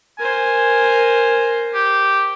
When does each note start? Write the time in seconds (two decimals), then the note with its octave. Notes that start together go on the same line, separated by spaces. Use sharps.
0.19 A#4 C5 G#5
1.74 G4